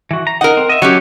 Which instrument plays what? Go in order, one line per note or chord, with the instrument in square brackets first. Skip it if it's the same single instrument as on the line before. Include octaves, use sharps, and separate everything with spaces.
[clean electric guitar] E3 F#4
A#5
[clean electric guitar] D#4 [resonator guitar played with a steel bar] A#4 F#5
[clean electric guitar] C4
D#5 E5
[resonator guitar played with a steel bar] F#3 C#4 G4 [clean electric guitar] C#5